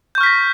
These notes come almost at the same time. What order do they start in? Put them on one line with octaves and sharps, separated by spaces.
G6 C#6 F6 B6 A#6